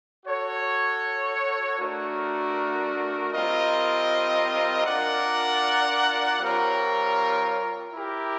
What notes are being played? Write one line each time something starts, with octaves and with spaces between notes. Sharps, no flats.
F#4 A4 C#5
A3 D4 F#4 A#4
G3 C4 F4 A#4 D#5
D4 F4 A#4 D5 F#5
G3 C4 F4 A#4 C#5
E4 G4 A#4